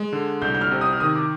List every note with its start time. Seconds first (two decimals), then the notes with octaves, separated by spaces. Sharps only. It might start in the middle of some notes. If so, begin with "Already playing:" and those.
Already playing: G#3
0.13 D3
0.42 C2 G6
0.54 G6
0.61 F6
0.71 C3
0.81 D#6
0.92 F6
1.00 D#3 D#6
1.15 D6